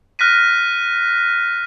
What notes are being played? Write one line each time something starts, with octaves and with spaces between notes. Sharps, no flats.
F6 F#6 A#6 B6 D#7